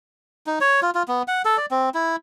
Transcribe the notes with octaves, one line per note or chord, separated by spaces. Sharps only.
D#4
C#5
F4
F4
B3
F#5
A4
D5
C4
E4